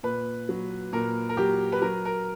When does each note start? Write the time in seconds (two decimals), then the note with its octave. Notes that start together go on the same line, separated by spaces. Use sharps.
0.03 A#2 B4
0.49 F#3
0.93 A#2 A#4
1.29 A#4
1.37 F#3 G4
1.72 B4
1.82 F#3 A#4
2.05 A#4